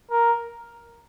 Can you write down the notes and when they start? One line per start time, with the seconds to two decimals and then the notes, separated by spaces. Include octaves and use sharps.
0.10 A#4